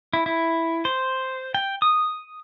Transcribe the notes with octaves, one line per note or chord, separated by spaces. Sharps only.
E4
E4
C5
G5
D#6